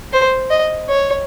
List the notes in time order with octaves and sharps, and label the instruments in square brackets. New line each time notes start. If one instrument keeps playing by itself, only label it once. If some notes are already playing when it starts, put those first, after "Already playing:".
[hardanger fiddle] C5
D#5
C#5